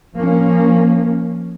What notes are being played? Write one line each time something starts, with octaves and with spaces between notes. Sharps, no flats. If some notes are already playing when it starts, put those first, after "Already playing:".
F3 A#3 C#4